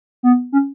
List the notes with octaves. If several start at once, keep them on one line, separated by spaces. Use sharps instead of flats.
B3
C#4